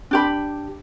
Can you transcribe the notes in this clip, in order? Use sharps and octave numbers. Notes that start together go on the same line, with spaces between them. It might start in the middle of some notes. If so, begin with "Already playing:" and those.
D4 G4 B5